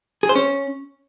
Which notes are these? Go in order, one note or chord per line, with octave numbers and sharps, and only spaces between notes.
G#4
C5
C#4